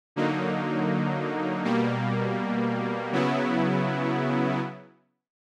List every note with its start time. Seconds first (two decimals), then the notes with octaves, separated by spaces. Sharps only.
0.16 D3 F#3 A#3 D#4
1.64 B2 G3 A#3
3.12 C#3 F#3 B3 E4